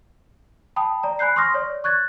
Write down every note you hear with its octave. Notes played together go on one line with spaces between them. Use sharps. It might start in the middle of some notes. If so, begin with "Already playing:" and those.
G5 A5 B5 D#6
D5 A#5
G#5 B5 F#6 G6 C7
C6 C#6 D#6 F6 A#6
C#5 D5
C#6 F#6 G#6 A6